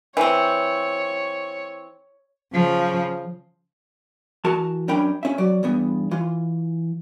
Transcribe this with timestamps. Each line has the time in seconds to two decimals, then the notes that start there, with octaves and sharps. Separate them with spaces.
0.17 E3 C4 C#5
2.53 C#3 F3
4.44 E3 F#4 A#4 A5
4.88 F#2 C#4 D4 A#4 G5 B5
5.23 C#4 E5
5.38 F#3 D5
5.63 E2 G2 B3
6.11 E3 F4